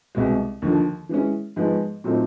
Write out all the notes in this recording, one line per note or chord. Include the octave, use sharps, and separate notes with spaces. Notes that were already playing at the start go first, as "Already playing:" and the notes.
C2 B2 G#3
D#2 D3 F3
E3 G#3 C#4
G#2 F3 G#3 B3
A#2 F#3 A3 C4 D#4